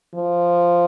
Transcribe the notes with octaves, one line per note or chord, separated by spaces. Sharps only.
F3